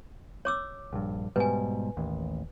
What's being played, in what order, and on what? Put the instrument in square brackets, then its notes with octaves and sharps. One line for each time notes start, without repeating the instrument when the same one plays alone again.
[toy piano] C#5 D6 E6
[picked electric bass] A#1 G2
[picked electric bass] G#2 B2 G3 [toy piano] B4 G#5
[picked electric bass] A1 D#2